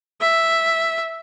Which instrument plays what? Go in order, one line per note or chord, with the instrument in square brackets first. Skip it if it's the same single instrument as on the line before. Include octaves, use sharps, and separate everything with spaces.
[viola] E5